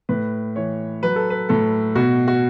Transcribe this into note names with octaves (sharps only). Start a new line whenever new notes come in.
A2 B4
E3 C#5
F#3 B4
A4
B4
A2 A4
B2 F#4
F#4